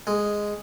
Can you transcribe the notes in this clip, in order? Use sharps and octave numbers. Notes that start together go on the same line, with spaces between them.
G#3